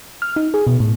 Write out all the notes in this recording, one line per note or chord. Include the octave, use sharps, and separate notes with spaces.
F6
D#4
G#4
B2
A2